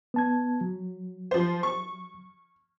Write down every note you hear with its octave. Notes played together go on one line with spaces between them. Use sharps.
B3 A5 G#6
F#3
F3 C5
C#6